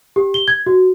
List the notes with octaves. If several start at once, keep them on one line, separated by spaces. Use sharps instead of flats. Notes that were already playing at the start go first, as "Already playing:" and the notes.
G4
G7
G#6
F#4